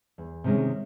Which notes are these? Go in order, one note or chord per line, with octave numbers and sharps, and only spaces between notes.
E2
C3 D#3 G#3 C#4